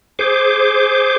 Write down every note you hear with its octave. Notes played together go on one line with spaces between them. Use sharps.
G#4 C5 D6